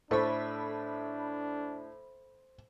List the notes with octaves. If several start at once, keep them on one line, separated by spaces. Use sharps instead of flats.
A2 D4 A4 C5 E5 B5 C#6